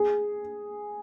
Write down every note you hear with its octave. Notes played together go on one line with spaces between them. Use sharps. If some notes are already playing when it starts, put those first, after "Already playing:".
Already playing: G#4